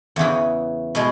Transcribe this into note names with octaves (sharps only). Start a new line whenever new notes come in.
E2 C#3 E3
B2 G#3